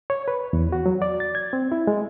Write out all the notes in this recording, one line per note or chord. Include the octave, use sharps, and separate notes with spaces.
C#5
B4
E2
F#4
F#3
D5
A6
G#6
C4
E4
G#3